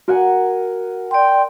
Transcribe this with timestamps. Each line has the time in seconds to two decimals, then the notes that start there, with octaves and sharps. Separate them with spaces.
0.08 F#4 A#4 F#5 G#5
1.11 D5 G5 C6